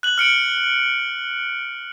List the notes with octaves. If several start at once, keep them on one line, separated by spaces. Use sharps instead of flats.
F#6 F#7
F6 C#7 D7 F#7